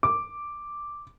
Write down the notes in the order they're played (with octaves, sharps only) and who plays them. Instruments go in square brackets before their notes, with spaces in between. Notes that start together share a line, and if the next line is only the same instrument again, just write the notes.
[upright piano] D6